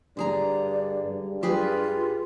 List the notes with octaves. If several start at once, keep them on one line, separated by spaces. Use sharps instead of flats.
G2 D3 G#4 D5 A#5
G2
F4 G4 G#4 B4